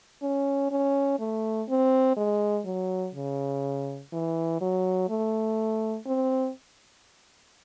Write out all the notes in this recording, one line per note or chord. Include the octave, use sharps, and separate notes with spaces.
C#4
C#4
A3
C4
G#3
F#3
C#3
E3
F#3
A3
C4